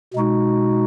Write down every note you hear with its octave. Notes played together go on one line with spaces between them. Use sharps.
B2 G#3 D#4 F#4